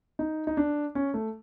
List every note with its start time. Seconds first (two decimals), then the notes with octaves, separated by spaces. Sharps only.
0.19 D#4
0.47 D#4
0.57 D4
0.95 C#4
1.14 A3